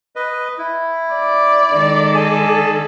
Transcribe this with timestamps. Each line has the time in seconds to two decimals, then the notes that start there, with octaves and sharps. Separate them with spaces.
0.16 B4 D#5
0.58 E4
1.14 D5
1.72 D#3 G#3 A4
2.15 G#4 G#5 A5